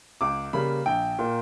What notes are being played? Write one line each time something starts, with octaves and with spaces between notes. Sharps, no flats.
C#2 D6
C#3 G3 A#3 B5
A#1 G5
A#2 A#3